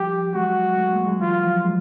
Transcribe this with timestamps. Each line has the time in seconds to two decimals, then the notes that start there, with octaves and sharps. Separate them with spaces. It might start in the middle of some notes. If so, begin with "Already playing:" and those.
Already playing: F3 G3 G4
0.34 F#3 G#3 F#4
0.77 G3 A3
0.92 G#3 A#3
1.06 F#3 G#3
1.21 E3 F#3 F4
1.42 F3 G3
1.64 F#3 G#3